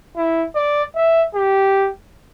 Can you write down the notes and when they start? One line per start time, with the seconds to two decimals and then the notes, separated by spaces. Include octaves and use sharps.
0.16 E4
0.55 D5
0.96 E5
1.34 G4